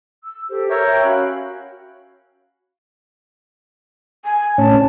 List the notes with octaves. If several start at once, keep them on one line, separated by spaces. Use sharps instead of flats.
E6
G4 A4 C5
A#4 C#5 E5 C#6 E6 G6
G5
C#4 F#4 F5 B5 F#6
G#5
A2 C#4 A5